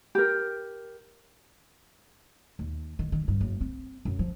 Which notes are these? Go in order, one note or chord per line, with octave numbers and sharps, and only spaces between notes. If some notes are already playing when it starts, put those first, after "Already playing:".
G4 A#4
D#2
D#3
D#3
G2
F#1
C4
F#2
F3